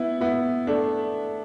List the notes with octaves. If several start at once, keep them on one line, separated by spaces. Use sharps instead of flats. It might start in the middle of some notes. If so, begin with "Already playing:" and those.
Already playing: B3 E4
B3 E4
A3 D4